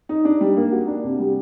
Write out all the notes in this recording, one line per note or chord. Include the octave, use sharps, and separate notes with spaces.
D#4
D4
G3
A#3
F#4
D4
C3
G3